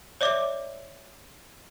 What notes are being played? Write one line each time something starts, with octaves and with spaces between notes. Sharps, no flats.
C#5 D5 E5 D6